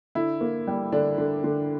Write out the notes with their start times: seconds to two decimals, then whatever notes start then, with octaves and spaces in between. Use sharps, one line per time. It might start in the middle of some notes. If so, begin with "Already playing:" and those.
0.15 D3 E4
0.41 A#3
0.67 G3
0.92 D3 D4
1.18 D3
1.44 D3